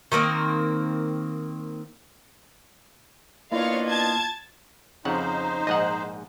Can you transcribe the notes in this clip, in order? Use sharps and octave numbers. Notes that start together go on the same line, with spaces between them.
D#3 A3 A#3 C4
A#3 B3 D4 E4 F4 C#5 D#5 F5
A5 G#6 A6
F2 C#3 D#4 C5 F#5
A#1 G#2 D#5 F#5